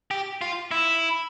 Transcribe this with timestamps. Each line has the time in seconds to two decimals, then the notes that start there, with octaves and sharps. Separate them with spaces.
0.11 G4
0.41 F4
0.71 E4